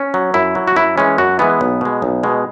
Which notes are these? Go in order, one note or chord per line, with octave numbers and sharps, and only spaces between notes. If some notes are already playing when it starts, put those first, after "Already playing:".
Already playing: C#4
F#3
F#2 E4
F#3
F#4
F#2 E4
E3 G#3 C#4
F#2 F#4
E3 G#3 B3
B1
B2 G#3
B1
B2 G#3